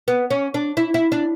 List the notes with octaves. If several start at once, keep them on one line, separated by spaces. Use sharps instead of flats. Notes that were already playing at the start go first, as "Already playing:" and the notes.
B3
C#4
D4
E4
E4
D4